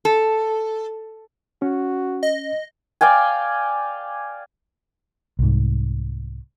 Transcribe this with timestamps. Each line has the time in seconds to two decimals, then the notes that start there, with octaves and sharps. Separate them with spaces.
0.05 A4
1.62 C#4 F#4
2.23 D#5
3.01 D5 F5 G5 G#5
5.39 C2 G#2